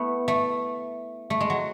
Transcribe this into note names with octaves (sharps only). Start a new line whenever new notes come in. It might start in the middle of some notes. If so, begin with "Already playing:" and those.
Already playing: A3 B3 E4
A3
A3
G#3
F#3